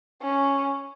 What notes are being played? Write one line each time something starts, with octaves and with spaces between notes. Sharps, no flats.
C#4